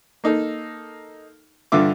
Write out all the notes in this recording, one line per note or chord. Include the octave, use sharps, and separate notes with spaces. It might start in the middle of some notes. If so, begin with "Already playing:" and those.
A#3 D#4 A4
G2 D3 F4 E5 D6